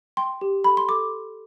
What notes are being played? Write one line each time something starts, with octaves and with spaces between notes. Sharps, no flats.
G5 C6
G4
A4 B5
C6
A4 D6